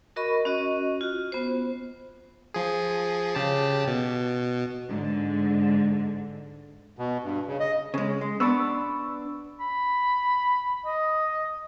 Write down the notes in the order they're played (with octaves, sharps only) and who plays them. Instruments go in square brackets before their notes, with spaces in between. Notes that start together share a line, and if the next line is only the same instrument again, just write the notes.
[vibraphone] F#4 A#4 D#5 B5 C#6
C#4 F#4 D#5
F4 F#4
B3 C5
[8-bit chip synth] F3 G#4
C#3 G4 A5
B2
[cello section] G#2 D3 G#3
[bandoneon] B2
G2
C#3
D#5
[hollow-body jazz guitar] C#3 G#3
G#3
[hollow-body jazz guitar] B3 D4 [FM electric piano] B5 C#6 E6
[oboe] B5
D#5